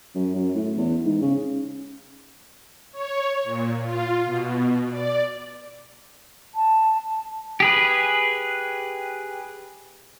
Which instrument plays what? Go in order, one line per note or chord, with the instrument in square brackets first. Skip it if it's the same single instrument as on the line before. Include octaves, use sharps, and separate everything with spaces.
[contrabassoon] F#2
F#2
A2
E2
G#2
C#3
[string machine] C#5
A#2
F4
B2
D5
[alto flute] A5
[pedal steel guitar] G4 G#4 B4